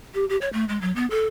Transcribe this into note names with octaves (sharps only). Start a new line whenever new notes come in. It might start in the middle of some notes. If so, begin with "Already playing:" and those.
G4
G4
C#5
A3
G#3
F#3
B3
A4